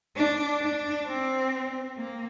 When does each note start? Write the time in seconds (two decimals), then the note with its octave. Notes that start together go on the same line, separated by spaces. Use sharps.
0.16 D4
0.61 D4
1.07 C4
1.97 A#3